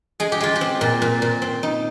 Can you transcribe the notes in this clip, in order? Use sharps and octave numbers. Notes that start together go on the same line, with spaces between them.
G#3 G#4
G4
G#3 F4
G4
C4
A#2
A#2
A#2
C4
D#4